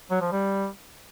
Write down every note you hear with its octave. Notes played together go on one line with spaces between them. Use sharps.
F#3
F3
G3